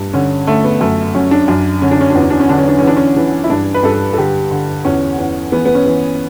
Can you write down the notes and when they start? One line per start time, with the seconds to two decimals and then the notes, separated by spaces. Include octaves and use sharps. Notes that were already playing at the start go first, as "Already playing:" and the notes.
Already playing: G2
0.13 D3 C#4
0.47 D3 A3
0.65 B3
0.80 F#2 A3
1.15 F#2 C#4
1.31 D4
1.48 F#2 D4
1.82 D3 C#4
1.91 D4
2.01 C#4
2.10 D4
2.15 E2
2.20 C#4
2.30 D4
2.40 C#4
2.49 D3 D4
2.58 C#4
2.68 D4
2.78 E3 C#4
2.87 D4
2.96 C#4
3.17 E3
3.44 E4
3.50 G2 D4
3.74 B4
3.83 G2 A4
4.13 A4
4.18 D3 G4
4.51 D3
4.85 E2 C#4
5.18 E2
5.52 E3 B3
5.65 B3
5.75 C#4
5.86 E3